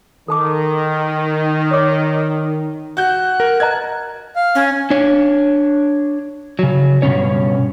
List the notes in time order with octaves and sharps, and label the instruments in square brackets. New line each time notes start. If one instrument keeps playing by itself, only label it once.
[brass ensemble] D#3 [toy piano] A4 A5 D6
[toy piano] C#5 D5 D6
[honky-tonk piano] F#4 G6 [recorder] F#6
[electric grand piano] A#4
[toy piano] B4 D#5 A#5 [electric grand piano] G#6
[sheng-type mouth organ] F5
[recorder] C#4
[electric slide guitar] D4 C#5
C#3 F#3
G2 B2 C#4 C#5